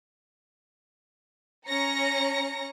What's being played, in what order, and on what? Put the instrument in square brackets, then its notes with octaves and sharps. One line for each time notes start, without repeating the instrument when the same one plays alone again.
[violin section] C#4 A#5 A#6 C#7